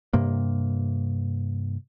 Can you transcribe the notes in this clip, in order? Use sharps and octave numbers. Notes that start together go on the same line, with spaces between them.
G2 C3 A#3